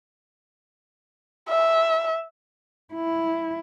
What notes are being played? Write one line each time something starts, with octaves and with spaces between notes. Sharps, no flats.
E5
E4